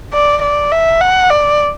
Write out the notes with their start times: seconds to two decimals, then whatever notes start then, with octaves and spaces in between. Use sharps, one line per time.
0.13 D5
0.42 D5
0.72 E5
1.01 F#5
1.30 D5